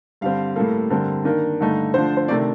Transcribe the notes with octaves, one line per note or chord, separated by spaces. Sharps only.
G2 D3 G3 C4 F5
A2 G3 A#3 A4
G2 D3 G3 C4 A#4
D#3 A#3 D4
G2 D3 A3 D#4
D3 F3 A3 D4 C5
C5
C3 D#3 A3 D4 D5